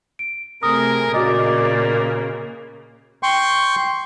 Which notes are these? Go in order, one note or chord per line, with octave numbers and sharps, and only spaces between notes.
D7
C3 A3 G#4 A#4 D#6
A#2 C#3 A#3 F#4 D5 D#5
G5 C6 C#6